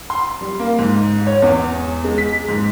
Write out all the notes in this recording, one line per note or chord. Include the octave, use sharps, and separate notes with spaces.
C6
G3
A#3
G#2
C#5
E2
G#3
B6
G#2